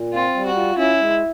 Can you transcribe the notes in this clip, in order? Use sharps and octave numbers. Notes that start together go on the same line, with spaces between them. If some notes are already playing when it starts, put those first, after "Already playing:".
Already playing: A#2
C4 F4
G3
F#4
F4
C#4 E4
G#3